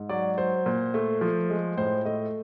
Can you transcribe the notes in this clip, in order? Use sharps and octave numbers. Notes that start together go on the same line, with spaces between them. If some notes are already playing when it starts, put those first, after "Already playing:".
Already playing: G#2
F#3 D5
F#3 C5
A#2
A3
F3
G#3
A2 C5
A3 D#5